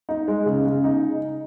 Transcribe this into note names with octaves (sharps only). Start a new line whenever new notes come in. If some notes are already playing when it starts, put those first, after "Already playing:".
D#4
G#3
C#3
C#3
D#4